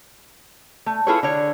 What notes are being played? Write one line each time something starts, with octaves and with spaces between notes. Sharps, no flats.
A3
E4 F4 G#4 A4 B4 C#5
D3 C#5